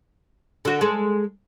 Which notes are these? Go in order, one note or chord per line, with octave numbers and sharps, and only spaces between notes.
D3 F#4
G#3 G#4 A4